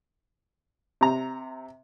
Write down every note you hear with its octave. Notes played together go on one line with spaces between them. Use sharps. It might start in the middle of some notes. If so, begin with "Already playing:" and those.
C3 A#5